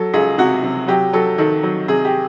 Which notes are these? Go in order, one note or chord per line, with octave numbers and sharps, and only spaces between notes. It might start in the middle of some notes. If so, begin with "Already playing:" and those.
Already playing: F#3 A4
C#2 G#4
C3 F#4
C3
F#3 G4
F#3 A4
D#3 A4
F#3
C3 G#4
G4